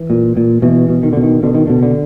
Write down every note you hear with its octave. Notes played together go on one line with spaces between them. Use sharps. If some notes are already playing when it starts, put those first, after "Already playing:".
Already playing: E3
A#2
A#2
B2 E3
B2
D#3
B2 D3
D#3
B2 D3
D#3
B2 D3
D3